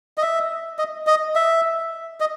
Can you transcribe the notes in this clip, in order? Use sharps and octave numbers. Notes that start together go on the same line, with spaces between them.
D#5
E5
D#5
D#5
E5
D#5